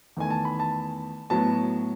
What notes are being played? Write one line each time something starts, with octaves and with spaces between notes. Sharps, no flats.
E2 D#3 A3 G#5
A5
B5
A5
A2 F#3 B3 A5